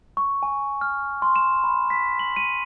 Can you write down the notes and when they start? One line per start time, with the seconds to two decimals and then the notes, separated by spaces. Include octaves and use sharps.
0.17 C#6
0.43 G#5
0.81 F6
1.22 C6
1.36 E7
1.64 B5
1.90 B6
2.19 F#7
2.36 D#7